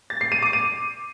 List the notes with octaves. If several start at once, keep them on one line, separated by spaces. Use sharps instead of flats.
A6
C7
D#7
D6
D#7